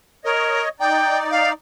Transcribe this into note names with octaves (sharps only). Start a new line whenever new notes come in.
A#4 C#5 D#5
D#4 D5 G5
F5